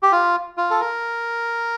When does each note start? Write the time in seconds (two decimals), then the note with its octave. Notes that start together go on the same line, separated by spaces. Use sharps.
0.03 G4
0.12 F4
0.57 F4
0.70 A4
0.80 A#4